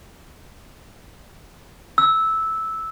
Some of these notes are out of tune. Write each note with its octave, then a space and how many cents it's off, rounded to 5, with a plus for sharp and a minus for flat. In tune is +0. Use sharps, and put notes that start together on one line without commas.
E6 -10